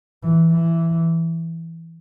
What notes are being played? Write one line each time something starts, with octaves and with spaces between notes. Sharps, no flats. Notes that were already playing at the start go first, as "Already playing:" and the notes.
E3
E3